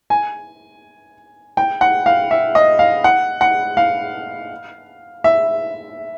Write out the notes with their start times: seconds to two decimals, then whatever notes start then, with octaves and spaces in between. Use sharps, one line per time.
0.10 G#5
1.57 G5
1.81 F#5
2.06 F5
2.31 E5
2.55 D#5
2.79 F5
3.04 F#5
3.41 F#5
3.77 F5
5.24 E5